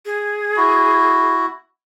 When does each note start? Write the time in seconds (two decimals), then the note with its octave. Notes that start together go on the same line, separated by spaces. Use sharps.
0.06 G#4
0.57 E4 F#4